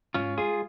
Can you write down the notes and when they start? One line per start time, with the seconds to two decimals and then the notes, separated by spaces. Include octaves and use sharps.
0.14 G#2 C#4 F4
0.38 G#3 F4 G#4